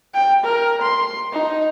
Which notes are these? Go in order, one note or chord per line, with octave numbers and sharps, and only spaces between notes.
G5
A#4
C6
D#4